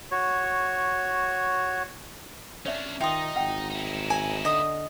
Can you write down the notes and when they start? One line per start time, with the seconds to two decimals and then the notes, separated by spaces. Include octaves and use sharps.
0.11 F#4 C#5
2.66 C#4 D4 C#5 D5 E5
3.01 D#3 D#4 F4 D#5 E5 G5 C6
3.36 G#1 F#5 G5
3.70 D#4 E4
4.10 G#5
4.45 D3 D#5 D#6